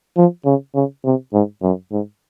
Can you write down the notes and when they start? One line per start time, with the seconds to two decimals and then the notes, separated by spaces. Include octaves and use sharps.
0.17 F3
0.45 C#3
0.75 C#3
1.05 C3
1.33 G#2
1.63 F#2
1.91 G#2